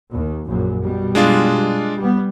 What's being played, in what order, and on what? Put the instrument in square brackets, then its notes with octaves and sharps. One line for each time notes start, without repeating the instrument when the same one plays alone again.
[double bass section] D#2
A#1 F#2 A#2
B2 G3
[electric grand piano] G#3 D4 F4
[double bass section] G3 B3